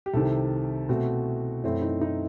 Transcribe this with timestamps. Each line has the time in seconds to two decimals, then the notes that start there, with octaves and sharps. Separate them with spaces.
0.06 G4
0.13 C2 C3 D#3 A4
0.89 B2 A3 C4 F#4
1.64 F#2 E3 A3 C4 E4
1.82 D#4
2.01 D#4